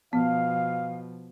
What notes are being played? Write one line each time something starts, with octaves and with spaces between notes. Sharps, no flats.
B2 F3 B3 F5